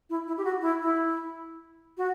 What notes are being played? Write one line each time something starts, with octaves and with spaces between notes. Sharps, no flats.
E4
E4
G4
F#4
E4
E4
F#4